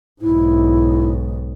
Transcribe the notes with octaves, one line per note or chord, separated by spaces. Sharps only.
B1 G#2 E4